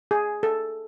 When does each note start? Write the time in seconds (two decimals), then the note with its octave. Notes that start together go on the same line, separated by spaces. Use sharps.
0.11 G#4
0.43 A4